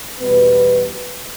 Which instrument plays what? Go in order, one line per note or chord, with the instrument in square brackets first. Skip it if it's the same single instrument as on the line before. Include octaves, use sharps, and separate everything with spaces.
[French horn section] E2 B2 G3 B3 B4